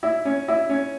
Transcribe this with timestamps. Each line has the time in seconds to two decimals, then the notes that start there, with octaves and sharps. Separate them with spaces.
0.03 E4
0.25 C#4
0.48 E4
0.69 C#4